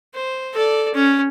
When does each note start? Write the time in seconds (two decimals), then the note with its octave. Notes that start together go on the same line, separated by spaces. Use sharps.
0.14 C5
0.54 A4 D5
0.94 C#4